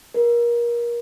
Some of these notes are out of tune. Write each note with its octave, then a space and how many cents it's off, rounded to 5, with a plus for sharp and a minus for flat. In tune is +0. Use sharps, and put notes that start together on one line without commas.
A#4 +30